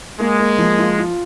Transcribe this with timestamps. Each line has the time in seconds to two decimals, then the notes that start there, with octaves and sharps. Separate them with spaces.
0.20 G#3 A#3
0.39 A#3
0.59 F3
0.79 F4
0.98 F4